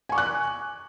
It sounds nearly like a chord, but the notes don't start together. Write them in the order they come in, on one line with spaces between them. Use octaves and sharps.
G#5 C#6 D6 F#6